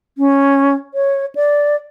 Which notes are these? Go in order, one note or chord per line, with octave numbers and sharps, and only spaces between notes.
C#4
C#5
D5